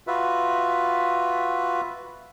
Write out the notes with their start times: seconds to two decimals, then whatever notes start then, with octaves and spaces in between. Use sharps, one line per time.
0.07 F4 F#4 B4 E5